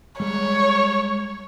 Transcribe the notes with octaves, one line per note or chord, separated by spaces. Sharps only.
G3 G#3 C#5